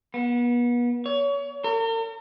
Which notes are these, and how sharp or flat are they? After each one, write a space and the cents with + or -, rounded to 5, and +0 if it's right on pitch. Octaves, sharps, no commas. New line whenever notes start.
B3 -35
C#5 +30
A#4 -45